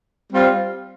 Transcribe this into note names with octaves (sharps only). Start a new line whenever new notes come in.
G3 C4 F4